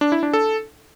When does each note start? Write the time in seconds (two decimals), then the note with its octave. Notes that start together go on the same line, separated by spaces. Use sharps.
0.01 D4
0.12 E4
0.23 D4
0.33 A4